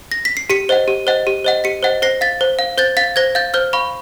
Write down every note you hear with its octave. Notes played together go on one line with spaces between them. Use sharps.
A#6
B6
C7
G4 B6 C#7
C5 D#5 F#5
G4
C5 D#5 F#5
G4
C5 D#5 F#5
G4 B6 C#7
C5 D#5 F#5
C5 A#6 C7
F5 A6 B6
C5
F5
C5 G6 A6
F5 A6 B6
C5 G#6 A#6
F5 G6 A6
C5 F6 G6
F5 B5 C#6